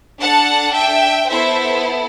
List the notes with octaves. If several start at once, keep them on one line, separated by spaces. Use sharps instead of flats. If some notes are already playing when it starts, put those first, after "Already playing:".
D4 A4 F#5 A5
E5 G5
B3 E4 A4 C5 E5